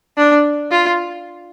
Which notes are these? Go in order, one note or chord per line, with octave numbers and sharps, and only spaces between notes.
D4
F4